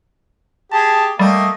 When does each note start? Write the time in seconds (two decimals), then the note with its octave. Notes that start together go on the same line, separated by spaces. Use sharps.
0.72 G4 G#4 A5
1.19 G3 A3 A#3 D#5 G5